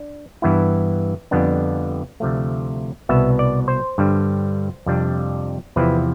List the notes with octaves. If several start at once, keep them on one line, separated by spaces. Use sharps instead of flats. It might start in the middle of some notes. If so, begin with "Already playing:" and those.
Already playing: D4
G2 E3 B3 E4
F2 D3 G3 B3 D4
D2 C3 F3 A3
C2 B2 B3 E5
D5
C5
G2 D3 G3
F2 C3 G3 D4
E2 C3 F3 C4 E4 B4